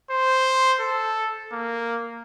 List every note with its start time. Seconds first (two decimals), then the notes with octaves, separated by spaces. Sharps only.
0.10 C5
0.80 A4
1.52 A#3